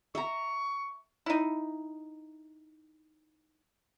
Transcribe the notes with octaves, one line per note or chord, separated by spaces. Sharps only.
E5 A#5 C#6
D#4 E4